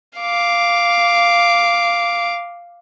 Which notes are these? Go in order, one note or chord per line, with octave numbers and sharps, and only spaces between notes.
F5 D6